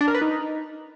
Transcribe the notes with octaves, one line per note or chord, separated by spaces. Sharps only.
D4
A#4
B4
D#4